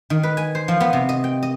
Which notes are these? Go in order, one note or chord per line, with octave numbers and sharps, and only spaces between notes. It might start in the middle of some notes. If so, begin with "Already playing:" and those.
D#3
B4
G#5
C5
F3
B3
C3
D#5
G5
D#5